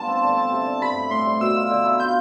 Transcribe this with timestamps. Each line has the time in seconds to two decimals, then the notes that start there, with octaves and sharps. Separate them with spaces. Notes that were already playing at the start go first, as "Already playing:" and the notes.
Already playing: G2 B3 F4 A5
0.08 C4
0.23 D3
0.37 C4
0.52 C3
0.66 D4
0.81 G2 B5
0.96 A3
1.11 A2 C6
1.26 G3
1.40 B2 E6
1.55 F4
1.70 D3
1.85 E4
2.00 F4 G6